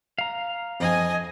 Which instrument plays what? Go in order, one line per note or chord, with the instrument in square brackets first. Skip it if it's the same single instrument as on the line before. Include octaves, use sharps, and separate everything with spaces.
[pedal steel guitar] F5 A#5
[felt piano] F2 C4 [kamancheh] D#5 G#5